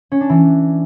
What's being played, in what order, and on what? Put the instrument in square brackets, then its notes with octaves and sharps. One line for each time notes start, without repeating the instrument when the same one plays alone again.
[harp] C#4
D4
E3